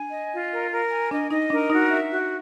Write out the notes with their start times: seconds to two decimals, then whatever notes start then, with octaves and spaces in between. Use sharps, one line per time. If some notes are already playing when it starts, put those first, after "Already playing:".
Already playing: D4 G#5
0.12 D#5
0.31 F4
0.51 A#4
0.71 A#4
0.91 G#5
1.11 D4 D#5
1.31 D#4 D#5
1.50 D4 A#4
1.70 D#4 F#4
1.91 E5
2.10 F#4